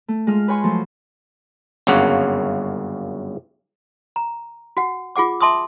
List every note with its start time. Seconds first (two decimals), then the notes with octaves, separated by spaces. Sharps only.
0.08 A3
0.27 G#3 F4 F6
0.48 B4 C#5 G#5 C6
0.64 F3 F#3 A3
1.87 G1 F#2 C#3 A#3 C#5 F#5
4.16 A#5
4.77 F#4 F#5
5.16 F4 G#4 F#5 D6
5.41 E5 A5 C6 D6 D#6